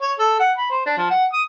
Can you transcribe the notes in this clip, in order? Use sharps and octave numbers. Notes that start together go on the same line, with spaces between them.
C#5
A4
F#5
B5
C5
D4
F3
F#5
D#6